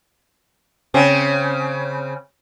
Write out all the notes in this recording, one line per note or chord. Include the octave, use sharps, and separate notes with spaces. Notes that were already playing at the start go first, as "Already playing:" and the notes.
C#3 C4